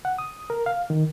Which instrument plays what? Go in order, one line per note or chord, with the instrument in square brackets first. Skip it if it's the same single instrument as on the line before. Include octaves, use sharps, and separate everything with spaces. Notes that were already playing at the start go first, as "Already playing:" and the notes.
[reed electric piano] F#5
D#6
A#4
F5
D#3